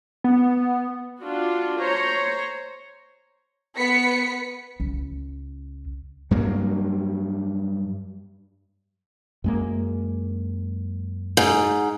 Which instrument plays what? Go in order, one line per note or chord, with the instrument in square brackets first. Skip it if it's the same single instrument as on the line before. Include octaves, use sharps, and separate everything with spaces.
[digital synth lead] B3
[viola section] D4 F4 F#4
C5 C#5 A#5
[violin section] B3 B4 B6 C#7
[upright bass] C#2
[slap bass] G2 F#3 A#3
[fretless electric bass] F#2 G#3 A#3
[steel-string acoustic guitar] G#2